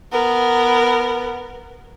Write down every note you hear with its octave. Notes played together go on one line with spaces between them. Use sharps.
B3 A#4